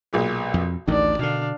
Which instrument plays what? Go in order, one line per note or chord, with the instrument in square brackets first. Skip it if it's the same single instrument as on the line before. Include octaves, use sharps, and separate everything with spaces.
[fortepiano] B1 A#2 G#3
[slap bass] F2
[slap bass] A1 D2 [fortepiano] D#3 [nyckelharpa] D4 D5
[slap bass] B2 D3 [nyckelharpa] D4 F5